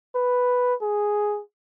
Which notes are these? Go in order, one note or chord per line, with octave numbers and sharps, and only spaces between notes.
B4
G#4